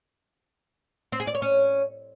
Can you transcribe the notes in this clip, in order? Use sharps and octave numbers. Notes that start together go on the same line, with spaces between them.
C4
G#4
D5
C#5
C#4